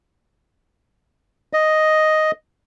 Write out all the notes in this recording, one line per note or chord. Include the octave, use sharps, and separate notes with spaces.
D#5